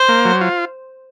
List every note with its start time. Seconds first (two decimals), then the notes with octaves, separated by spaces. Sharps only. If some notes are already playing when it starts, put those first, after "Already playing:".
Already playing: C5
0.09 A#3
0.25 F#3
0.41 F4